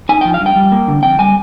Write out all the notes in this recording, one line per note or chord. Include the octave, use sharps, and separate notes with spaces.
D#4 G#5
F3 G5
F5
G2
G5
G3
A#3
D3
F2 G5
G3 G#5